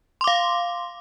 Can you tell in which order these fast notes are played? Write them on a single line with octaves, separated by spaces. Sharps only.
C6 D6 F5